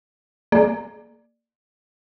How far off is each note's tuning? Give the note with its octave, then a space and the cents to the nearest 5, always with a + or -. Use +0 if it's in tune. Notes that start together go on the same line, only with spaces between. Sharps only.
A#3 -10 G#4 +30 D5 +15